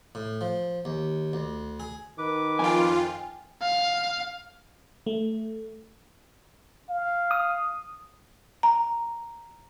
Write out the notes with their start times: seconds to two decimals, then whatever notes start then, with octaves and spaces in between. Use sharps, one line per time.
0.15 A2
0.41 F3
0.85 D#2
1.33 D2
1.80 G#4
2.18 D#3 B4 D6
2.59 F2 F4 G5 G#5
3.62 F5
5.06 A3
6.90 F5
7.31 D#6
8.63 A#5